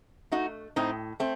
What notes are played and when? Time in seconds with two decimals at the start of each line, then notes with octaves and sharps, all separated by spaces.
0.32 A3 D#4 F#4
0.76 A2 C4 D#4
1.20 A3 C4